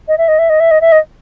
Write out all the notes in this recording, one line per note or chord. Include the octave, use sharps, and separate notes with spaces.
D#5
E5
D#5
E5
D#5
E5
D#5
E5
D#5